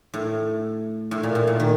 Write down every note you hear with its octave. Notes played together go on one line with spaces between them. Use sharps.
A2
A2
A#2
A2
A#2
D#3